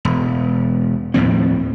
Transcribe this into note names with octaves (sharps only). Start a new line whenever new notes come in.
E1
D#2 A2 F3 C4